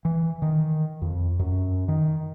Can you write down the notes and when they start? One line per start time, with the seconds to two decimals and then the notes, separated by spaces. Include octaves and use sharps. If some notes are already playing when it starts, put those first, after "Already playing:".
0.05 E3
0.42 D#3
1.02 F2
1.39 F#2
1.88 D#3